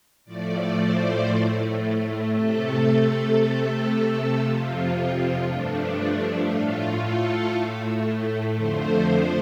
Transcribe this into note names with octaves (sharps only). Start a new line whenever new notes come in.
A2 F3 A3 D5
C5
A2 A3
C3 A3 A4
C3 A3 A4
F2 C3 F3 F4
G2 F3 A3 D4
D4
A2 A3 F4
A4
A2 A3
F2 D3 F3 A3 C5